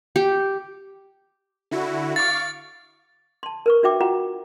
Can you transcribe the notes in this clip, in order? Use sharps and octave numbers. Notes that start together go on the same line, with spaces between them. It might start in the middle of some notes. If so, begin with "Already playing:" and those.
G4
D3 E4 F#4
F5 C#6 D6 A6
A5 C6
A#4 B4 C#6
D4 F#4 E5 G5 D6
F4 F#4 F#5 G5 A#5